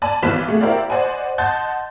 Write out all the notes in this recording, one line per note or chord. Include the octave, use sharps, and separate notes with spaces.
D5 G#5 A5 B5
B1 G2 E3 B4 B6 E7
A3 G#4
E4 G4 A#4 C5 D5 F5
C5 D5 D#5 F#5 G#5 B5
D#5 F#5 A5 C6 G6 A6